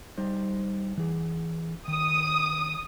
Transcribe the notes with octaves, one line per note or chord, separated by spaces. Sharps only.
G3 D#4 C5
E3 G#4
D#3 D#6